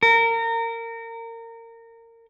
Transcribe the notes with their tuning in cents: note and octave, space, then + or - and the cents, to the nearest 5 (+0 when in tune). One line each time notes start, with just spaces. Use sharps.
A#4 -25